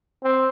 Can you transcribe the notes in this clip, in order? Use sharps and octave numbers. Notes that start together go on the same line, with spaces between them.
C4